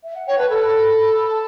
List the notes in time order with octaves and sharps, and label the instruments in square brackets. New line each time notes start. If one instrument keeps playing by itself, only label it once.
[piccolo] E5
F#5
[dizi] C#5 [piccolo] G5
[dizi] B4 [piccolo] A5
[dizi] A4 [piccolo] B5
[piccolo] A5